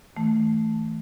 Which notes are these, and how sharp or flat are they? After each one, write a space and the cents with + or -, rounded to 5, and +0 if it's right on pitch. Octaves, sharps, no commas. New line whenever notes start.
E3 -30 A3 +0